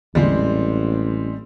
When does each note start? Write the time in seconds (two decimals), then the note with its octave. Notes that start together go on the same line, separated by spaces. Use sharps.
0.15 A1 E2 A#2 D3 G3 G#3 C4